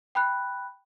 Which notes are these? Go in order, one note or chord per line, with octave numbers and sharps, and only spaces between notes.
G5 B5 F#6